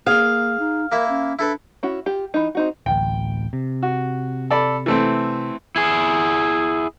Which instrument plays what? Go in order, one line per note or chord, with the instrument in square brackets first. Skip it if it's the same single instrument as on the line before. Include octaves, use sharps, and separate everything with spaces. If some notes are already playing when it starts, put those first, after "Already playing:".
[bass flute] A#3 [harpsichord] G#4 [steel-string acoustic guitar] F5
[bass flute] D#4
[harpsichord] A#3 E4 E5 [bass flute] A#4
[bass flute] C#4
[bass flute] D4 [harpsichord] E4 A4 B4
[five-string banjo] C#4 E4 F#4
F4 G4
E3 D#4
C4 D#4 F#4
[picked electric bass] D1 A1 [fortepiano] G5
[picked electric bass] C3
[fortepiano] F#4
A4 D5 B5
E3 A3 C4
[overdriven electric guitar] E4 G#4